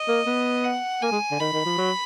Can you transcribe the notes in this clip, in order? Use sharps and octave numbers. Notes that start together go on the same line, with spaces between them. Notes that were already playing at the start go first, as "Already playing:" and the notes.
Already playing: D#5
A#3
B3
F#5
A#3 G#5
G#3
D3
D#3 B5
D#3
F3
F#3